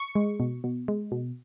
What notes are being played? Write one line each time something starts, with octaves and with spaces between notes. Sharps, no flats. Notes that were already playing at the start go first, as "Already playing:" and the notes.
Already playing: C#6
G#3
B2
B2
G#3
B2